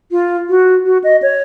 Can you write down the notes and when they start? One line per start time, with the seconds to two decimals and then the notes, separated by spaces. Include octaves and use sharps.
0.11 F4
0.49 F#4
0.85 F#4
1.04 D#5
1.22 C#5